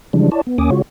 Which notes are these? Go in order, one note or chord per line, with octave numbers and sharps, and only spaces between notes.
C#3 E3 F3 G3 G#3 D4
E4 C#5 D5 A5
B3
D#2 A#3 C#4 G#5 D6 D#6
C#3 G#3 F4 F#4 C#5